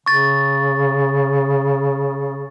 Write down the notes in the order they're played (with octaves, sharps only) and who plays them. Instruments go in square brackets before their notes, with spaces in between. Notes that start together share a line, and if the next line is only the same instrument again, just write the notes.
[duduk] C#3 [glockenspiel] C#6 A6